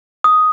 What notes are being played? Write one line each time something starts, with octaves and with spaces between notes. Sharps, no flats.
D#6